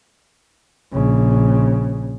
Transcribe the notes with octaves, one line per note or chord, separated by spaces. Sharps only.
A#1 C#3